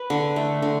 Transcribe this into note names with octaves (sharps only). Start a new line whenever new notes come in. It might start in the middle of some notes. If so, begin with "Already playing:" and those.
Already playing: B4
D3
A3
D3